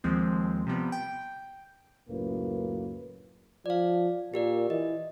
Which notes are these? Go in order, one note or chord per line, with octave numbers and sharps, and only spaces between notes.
D#2 F3 G#3 C4
C3 F3 G3 B3
G5
C#2 F#2 A2 A#3 B4
F3 D5 F5
A#2 G4 A#4 D5
E3 D#5